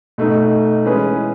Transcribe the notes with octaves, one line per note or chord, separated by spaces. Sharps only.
B2 A3 D#4
E3 G#3 C#4 G#4 B4